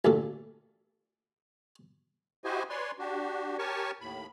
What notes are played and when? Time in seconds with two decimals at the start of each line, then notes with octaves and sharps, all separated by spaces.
0.05 A1 D2 A#2 A4
2.44 E4 F#4 G4 C5 D#5 G#5
2.70 B4 C#5 D5 G#5 C6
2.99 D4 F#4 G4
3.59 G4 A#4 C#5 G#5 A5 C#6
4.01 D#2 A2 B5